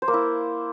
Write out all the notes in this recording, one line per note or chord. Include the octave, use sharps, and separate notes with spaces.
C5
A#3
E4